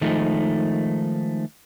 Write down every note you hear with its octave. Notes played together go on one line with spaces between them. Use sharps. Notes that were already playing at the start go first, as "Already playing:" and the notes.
D#3 F3 G#3 A3 D#4